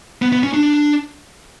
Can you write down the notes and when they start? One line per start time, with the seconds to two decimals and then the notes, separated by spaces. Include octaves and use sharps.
0.22 B3
0.32 B3
0.43 C#4
0.54 D4